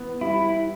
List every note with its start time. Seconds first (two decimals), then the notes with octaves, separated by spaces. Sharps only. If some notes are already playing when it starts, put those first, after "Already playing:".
Already playing: E3 B3
0.21 G3 E4